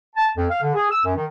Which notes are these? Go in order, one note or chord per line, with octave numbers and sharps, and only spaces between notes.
A5
F2
F5
D3
G#4
E6
F#2
D#3